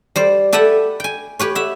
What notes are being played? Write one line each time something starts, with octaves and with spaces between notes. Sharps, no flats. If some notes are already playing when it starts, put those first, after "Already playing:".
G3 C5 D5
G4 A4 B4 E5 F#5
G5 G#5
G4 B4 C#5
E5 F#5